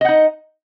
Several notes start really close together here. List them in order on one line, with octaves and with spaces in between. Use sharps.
D#5 F#5 D#4